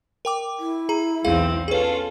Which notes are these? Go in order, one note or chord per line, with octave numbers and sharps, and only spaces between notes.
A#4 G5 D6
E4
G#4 A#5
B1 E2 C4 G#4 F5
C#4 F4 G#4 A4 B4